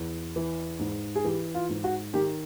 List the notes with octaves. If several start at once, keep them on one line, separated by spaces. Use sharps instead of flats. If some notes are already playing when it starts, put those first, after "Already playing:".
Already playing: E2
E3
G#2
G#4
E3 G4
F4
G#2
F#4
D#3 G4